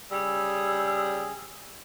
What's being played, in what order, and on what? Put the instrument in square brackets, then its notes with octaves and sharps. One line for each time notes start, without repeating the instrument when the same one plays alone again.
[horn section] C#3 G3 G#4 [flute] E6